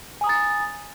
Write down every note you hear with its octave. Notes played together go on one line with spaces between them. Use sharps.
G#5 A#5 D#6 A6